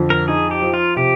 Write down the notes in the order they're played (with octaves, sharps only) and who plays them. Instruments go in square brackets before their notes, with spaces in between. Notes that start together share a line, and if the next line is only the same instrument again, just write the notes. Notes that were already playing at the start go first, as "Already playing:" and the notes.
Already playing: [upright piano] F2 D3
[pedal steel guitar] A#4
[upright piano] D#4 [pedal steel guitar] G#4
[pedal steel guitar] G4
[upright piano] F3
[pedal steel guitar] F4
[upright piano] C3 [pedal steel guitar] G4